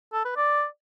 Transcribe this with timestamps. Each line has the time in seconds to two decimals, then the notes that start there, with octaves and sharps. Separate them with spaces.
0.13 A4
0.25 B4
0.36 D5